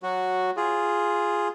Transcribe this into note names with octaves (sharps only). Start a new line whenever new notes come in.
F#3 F#4
F4 G#4